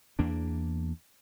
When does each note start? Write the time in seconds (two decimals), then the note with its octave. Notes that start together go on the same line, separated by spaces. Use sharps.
0.19 E2 A#3 D4